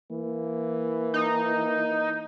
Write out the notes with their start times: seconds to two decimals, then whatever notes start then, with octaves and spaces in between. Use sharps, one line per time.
0.11 E3 A#3
1.14 D#4